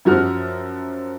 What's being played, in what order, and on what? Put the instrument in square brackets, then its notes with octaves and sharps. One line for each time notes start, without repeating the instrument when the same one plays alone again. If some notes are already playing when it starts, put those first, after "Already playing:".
[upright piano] F#2 F3 F#4 F6